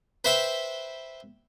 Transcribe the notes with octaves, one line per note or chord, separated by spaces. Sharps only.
B4 C5 E5 G5